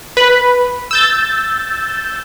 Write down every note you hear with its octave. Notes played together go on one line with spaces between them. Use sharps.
B4 B5
E6 G6 A6